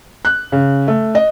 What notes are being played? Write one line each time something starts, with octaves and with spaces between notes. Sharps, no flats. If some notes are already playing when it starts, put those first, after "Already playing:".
F#6
C#3
A3
D#5